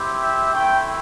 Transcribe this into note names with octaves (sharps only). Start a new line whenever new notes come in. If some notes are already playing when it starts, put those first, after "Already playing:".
Already playing: C4 E4 G4
E5
A3 C4 E4 G5